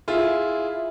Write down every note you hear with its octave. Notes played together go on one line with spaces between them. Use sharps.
E4 F4 G#4